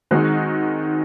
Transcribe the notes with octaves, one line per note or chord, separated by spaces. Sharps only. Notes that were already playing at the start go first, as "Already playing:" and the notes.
D#3 G#3 C4 D#4 F#4